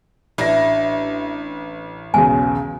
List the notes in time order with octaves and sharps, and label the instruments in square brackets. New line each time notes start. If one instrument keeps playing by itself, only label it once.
[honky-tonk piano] A1 A#6 [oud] D4 E4
[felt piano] B1 E2 C#3 [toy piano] G#5